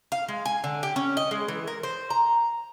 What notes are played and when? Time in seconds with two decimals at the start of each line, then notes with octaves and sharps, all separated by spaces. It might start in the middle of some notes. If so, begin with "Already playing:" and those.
0.12 F5
0.28 G#3
0.45 G#5
0.64 D3
0.83 G4
0.96 C#4
1.17 D#5
1.31 G#3
1.48 E3
1.67 A#4
1.83 C5
2.10 A#5